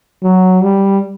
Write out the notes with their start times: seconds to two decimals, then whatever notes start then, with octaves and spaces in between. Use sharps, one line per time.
0.23 F#3
0.63 G3